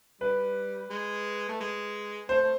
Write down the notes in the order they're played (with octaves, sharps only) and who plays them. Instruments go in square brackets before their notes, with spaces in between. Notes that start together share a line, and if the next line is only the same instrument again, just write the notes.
[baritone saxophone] G3 [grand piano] B4
[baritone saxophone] G#3
A3
G#3
[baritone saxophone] A3 [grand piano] C5
[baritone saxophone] A3